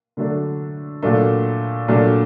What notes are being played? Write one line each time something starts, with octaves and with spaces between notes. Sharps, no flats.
D3 F#3 A3 D4
A#2 F#3 A3 D4
A#2 F#3 A3 D4